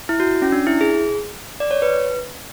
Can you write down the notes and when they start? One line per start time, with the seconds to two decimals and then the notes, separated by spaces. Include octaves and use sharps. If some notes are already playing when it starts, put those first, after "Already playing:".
0.09 E4
0.20 F#4
0.42 C#4
0.52 D4
0.67 E4
0.81 G#4
1.60 D5
1.71 C#5
1.82 B4